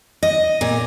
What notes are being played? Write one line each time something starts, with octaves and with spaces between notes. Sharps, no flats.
D#5
A#2